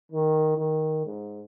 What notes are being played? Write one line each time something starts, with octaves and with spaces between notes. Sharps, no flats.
D#3
D#3
G#2